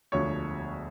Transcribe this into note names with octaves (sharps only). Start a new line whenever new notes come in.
E1 D2 D3 F3 C#5